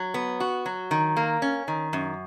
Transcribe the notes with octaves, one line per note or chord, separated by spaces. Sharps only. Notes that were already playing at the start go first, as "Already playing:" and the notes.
Already playing: F#3
B3
F#4
F#3
D#3
A#3
C#4
D#3
F#2